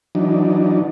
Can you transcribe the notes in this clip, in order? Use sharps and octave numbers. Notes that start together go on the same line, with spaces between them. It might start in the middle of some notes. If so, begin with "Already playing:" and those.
E3 F#3 D4 D#4